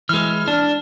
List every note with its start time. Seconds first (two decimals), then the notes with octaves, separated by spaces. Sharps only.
0.09 E3 G#3 F6
0.48 D4